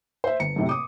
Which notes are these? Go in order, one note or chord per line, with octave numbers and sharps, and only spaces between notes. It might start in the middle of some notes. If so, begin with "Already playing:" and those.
C5 E5
G1 C#7
F#2 A2 C3
D6 D#6